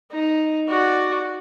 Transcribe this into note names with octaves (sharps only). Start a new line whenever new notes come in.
D#4
F#4 D5